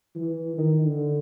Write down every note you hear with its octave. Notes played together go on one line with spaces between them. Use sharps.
E3
D#3
D3